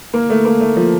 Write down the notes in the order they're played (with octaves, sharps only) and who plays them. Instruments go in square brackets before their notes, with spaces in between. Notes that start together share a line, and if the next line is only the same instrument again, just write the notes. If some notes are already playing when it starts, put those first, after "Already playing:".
[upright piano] A#3
A3
A#3
A3
F3